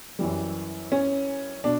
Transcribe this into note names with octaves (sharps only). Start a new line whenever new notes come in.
F#2 E3 G3
C#4
B2 D4